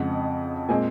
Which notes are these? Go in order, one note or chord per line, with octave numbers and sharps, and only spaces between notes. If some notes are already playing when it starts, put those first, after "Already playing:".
Already playing: F2 C#3 G#3 C4 F#5
A#2 G#3 C4 G#5